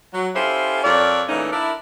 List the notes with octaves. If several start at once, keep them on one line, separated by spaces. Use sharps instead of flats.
F#3
C#4 E4 F4 G4 A4 C5
F2 A#4 C#5 D5
A#2 C#3 E3 A3 C#4 D#4
D4 E4 A#4